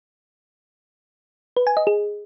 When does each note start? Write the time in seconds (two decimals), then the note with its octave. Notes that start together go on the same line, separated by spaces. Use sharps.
1.57 B4
1.67 G#5
1.77 D#5
1.87 G#4